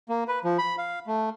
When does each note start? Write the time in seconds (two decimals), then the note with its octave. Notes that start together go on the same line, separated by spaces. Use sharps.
0.09 A#3
0.28 B4
0.44 F3
0.59 B5
0.78 F5
1.07 A3